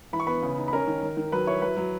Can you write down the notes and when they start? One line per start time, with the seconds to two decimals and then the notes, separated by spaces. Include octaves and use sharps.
0.13 E3 B5
0.20 C#6
0.27 B3 B4 B5
0.43 C#3
0.58 D#4
0.68 B5
0.73 C#4 A#4 A#5
0.87 D#3
1.03 D#3
1.17 D#3
1.32 F#3 B4 B5
1.47 E4 C#5 C#6
1.62 F#3 B4 B5
1.77 F#3